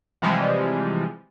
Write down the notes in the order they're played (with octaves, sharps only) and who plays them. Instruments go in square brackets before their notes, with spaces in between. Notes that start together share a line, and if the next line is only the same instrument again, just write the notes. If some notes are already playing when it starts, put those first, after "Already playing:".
[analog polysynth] C3 E3 F3 G3 G#3